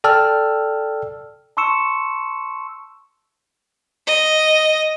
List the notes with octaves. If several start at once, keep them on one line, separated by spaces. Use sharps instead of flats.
A4 D5 G5 A5 E6 F6
A5 C6 C#6 E6 C#7 E7
D#5